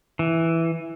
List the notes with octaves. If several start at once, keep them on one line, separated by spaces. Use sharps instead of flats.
E3